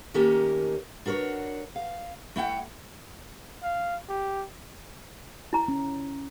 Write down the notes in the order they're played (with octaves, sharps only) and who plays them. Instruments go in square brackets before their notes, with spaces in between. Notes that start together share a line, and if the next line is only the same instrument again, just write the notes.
[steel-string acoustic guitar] D#3 A3 A#3 C#4 G4 A#4
D4 F#4 A#4 C5 C#5
F5
A3 E4 F#5 G5
[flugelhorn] F5
G4
[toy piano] E4 A#5
[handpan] C#4